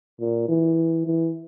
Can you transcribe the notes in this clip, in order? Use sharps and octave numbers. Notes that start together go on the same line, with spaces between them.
A#2
E3
E3